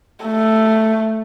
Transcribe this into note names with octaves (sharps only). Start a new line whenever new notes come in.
A3